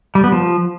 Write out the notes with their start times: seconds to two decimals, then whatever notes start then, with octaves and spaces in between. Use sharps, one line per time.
0.15 G3
0.24 B3
0.32 F3